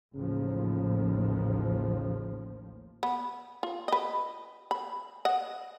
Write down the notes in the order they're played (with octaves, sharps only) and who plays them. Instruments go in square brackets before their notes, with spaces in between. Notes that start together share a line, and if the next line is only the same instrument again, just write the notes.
[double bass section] A1 D#2 F3 [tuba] C#3
[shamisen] B3
F4
B4 D#5
B5
D#5 F#5